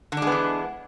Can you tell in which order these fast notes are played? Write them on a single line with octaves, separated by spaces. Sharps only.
D3 D4 G#3 B3 E3